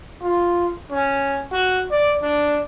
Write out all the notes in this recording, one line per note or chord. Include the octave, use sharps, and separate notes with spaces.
F4
C#4
F#4
D5
D4